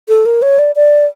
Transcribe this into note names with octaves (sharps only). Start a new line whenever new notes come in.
A4
A#4
C#5
D5
D5